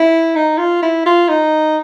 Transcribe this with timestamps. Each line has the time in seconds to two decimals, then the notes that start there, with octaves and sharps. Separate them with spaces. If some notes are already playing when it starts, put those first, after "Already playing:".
Already playing: E4
0.35 D#4
0.58 F4
0.82 E4
1.06 F4
1.28 D#4